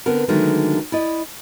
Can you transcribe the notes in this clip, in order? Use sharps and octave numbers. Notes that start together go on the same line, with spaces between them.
D3 B3 C4 A#4
D3 D#3 F#3 G#3 A3 D4
E4 D5 D#5